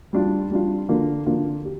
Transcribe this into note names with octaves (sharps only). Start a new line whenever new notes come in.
G3 D4 F4
G3 D4 F4
D3 A#3 D4 F4
D3 A#3 D4 F4
G4